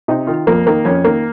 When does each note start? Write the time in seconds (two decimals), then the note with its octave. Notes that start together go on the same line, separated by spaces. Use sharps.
0.08 C3 D#4
0.27 D#3 F4
0.47 F2 A#3
0.67 D#3 A#3
0.85 F2 C#4
1.04 D#3 A#3